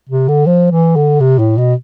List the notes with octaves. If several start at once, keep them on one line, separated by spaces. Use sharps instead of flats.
C3
D3
F3
E3
D3
C3
A2
B2